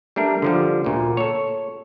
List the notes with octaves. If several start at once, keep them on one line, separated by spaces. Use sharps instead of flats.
G3 A3 D4 A#4
D3 F3 G3
D2 A#2
A4 C#5